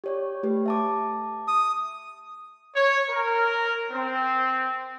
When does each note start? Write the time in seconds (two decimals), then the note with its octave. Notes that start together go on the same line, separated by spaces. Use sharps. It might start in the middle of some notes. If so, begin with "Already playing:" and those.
0.04 G4 C#5 D5
0.43 A3 G4 B4
0.66 E5 A5 D6
1.48 D#6
2.75 C#5
3.09 A#4
3.91 C4